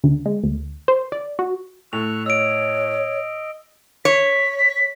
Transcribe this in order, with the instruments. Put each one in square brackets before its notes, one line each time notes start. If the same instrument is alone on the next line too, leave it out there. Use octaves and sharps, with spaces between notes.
[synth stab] D2
G#3
D2
C5
D5
F#4
[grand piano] A2 [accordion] C#6 E6 F#6 [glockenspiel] F7
[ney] C#5 [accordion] D#5 [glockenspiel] E6 D7
[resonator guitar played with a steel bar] C#5 [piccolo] B6